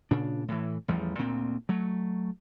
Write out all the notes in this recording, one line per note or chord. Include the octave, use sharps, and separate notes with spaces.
A#2 C#3 D4
A2 E3
A1 E2 F3 G3
D2 A#2 C4
F#3 A3